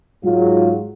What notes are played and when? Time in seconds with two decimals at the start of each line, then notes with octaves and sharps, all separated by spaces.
0.24 G#2 F#3 F4